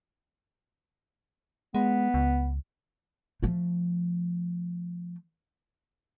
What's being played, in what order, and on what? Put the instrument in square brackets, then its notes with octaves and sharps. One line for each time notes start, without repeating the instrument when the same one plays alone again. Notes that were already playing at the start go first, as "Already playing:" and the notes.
[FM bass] G#3 [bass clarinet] B3
[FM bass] C#2
[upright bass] F3 A3